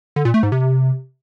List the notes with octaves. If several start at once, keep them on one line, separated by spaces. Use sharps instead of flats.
D3
A#2
A3
G#2
C3